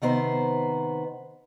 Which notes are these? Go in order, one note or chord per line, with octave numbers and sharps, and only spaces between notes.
C3 D#3 B3 C5 A#5